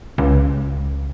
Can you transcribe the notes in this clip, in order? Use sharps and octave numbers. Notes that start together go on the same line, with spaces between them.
C#2